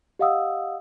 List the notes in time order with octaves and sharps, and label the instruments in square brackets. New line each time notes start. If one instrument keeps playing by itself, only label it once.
[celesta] G4 D#5 F5 F#5 D#6 E6